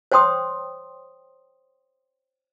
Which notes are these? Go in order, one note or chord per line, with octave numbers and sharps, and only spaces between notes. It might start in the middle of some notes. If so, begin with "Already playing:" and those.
C5 C#5 G5 C6 D#6